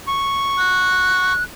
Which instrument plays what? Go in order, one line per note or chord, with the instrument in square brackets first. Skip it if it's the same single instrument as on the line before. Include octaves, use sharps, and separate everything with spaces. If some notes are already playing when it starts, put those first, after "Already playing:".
[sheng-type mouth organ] C#6
[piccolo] F#6